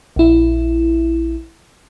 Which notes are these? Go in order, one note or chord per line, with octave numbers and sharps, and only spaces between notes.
A#1 E4